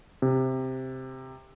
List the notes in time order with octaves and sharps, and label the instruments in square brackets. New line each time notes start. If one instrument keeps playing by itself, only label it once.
[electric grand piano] C3